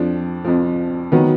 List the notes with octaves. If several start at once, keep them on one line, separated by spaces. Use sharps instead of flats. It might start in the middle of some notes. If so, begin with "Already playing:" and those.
Already playing: F2 F3 D4
F2 F3
D#3 F#3 B3